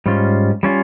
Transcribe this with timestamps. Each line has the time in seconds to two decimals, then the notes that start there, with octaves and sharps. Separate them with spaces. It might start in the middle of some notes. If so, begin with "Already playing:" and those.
0.06 G#2 G3 C#4 F4
0.63 G3 C#4 F4